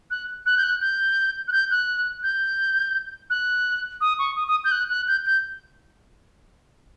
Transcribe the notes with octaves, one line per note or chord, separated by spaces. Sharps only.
F#6
F#6
G6
F#6
G6
F#6
G6
F#6
G6
F#6
D#6
C#6
D#6
D#6
G6
F#6
F#6
G6
G6